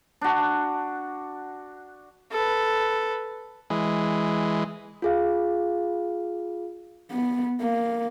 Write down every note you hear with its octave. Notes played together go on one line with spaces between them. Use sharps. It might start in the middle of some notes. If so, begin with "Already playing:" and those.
D4 F#4
A4 B4
E3 G#3
F4 G#4 F5
B3
A#3